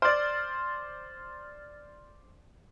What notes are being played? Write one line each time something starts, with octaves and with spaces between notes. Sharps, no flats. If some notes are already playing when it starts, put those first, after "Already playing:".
C5 D5 F6 A6